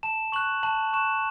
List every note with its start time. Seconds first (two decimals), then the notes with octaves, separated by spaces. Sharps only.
0.03 A5 E7
0.32 C#6 F#6 F#7
0.63 A5 F#7
0.93 C#6 F#6 E7